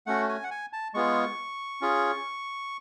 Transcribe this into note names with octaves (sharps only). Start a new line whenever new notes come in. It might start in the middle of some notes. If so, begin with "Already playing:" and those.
A3 C#4 F#4 F#5
G#5
F#5
G#5
A5
G#3 B3 F4 G#4 C#6
C#4 F4 G#4